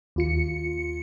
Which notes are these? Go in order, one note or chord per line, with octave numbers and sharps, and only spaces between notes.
D#2 F4 C#7